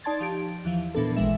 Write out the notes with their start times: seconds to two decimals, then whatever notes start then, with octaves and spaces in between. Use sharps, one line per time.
0.04 D#4 D5 A5 C6 G#6 A6
0.20 F3 G4 D7
0.65 E2 E3 F3
0.95 A#2 E3 B3 D4 A4
1.16 A1 E3 G#3 E5